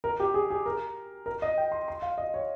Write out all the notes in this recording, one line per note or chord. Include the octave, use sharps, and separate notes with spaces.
A#4
G4
G#4
G#4
A#4
A#4
D#5
G5
C6
C6
F5
D#5
C#5